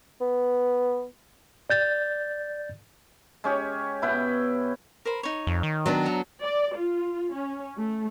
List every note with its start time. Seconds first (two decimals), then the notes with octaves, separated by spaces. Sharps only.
0.21 B3
1.70 D5 G6 A6
3.44 G#3 C#4 G4 C#5
4.02 B2 E4 B4 G5
5.05 A#4 C5 B5
5.23 D#4 C#5
5.47 F2
5.63 D#3
5.86 F#3 B3 D4
6.05 D#4 E5 A#5
6.42 D5
6.76 F4
7.34 C#4
7.78 A3